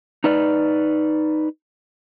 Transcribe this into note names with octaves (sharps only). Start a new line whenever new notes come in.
D#4 B4 D5